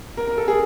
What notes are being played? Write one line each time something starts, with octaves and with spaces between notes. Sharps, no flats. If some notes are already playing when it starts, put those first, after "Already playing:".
A#4
A#4
A4
G#4